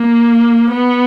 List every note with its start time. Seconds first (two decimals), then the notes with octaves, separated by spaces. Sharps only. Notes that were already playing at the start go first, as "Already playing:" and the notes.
Already playing: A#3
0.70 B3